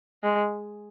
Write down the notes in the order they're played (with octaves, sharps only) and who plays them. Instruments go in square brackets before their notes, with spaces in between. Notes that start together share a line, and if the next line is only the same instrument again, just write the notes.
[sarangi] G#3